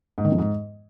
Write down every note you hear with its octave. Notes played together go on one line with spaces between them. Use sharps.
G#2
D#3
F2
G#2